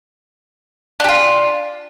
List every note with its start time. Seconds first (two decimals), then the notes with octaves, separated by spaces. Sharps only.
1.00 D4
1.04 G4
1.09 F4